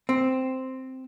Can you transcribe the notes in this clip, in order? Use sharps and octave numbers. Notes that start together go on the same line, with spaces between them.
C4